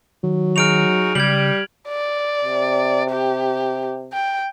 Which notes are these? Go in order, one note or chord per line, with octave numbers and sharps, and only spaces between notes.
D#3 F#3
D#4 F#4 G#4 F6 D7 F7
C#3 G3 G#6 F#7
D5
C3
G4
G5